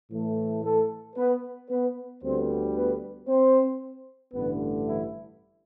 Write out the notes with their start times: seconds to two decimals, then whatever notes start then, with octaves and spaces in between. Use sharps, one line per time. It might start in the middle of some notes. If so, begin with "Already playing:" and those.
0.12 A2 E3 A3
0.64 A3 A4
1.16 B3 B4
1.69 B3 B4
2.22 D2 D3 G3 B3 C4 C5
2.75 B3 B4
3.28 C4 C5
4.33 A1 G2 D3 A3 B3 B4
4.86 E3 E4